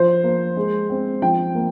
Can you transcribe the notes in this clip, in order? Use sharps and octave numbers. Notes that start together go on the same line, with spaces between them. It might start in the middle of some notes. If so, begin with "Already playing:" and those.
Already playing: F3 C5
A#3
G#3
C4
F3 G5
A#3